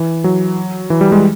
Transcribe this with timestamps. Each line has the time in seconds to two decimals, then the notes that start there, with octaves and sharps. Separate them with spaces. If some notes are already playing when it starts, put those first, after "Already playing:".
Already playing: E3
0.24 F#3
0.90 E3
1.01 G3
1.12 G#3